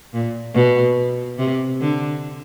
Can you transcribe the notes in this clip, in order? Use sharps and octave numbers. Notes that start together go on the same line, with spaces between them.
A#2
B2
C3
D3